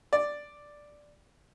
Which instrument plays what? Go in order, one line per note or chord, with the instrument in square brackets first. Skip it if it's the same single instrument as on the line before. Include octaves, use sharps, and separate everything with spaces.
[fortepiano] D5